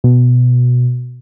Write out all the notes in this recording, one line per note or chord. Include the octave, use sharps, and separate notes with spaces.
B2